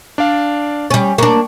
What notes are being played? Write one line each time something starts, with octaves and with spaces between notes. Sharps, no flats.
D4 D5 F5
G3 C#4
A#3 D4 C#6